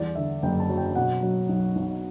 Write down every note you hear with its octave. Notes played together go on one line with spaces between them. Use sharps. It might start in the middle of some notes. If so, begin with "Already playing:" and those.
Already playing: E2 G3 D5
D3 E5
F#1 G5
A5
F#3
G5
B2 F#5
F#3
B1
B1